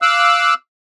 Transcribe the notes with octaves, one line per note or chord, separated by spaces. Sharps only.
F5 D6 E6 F#6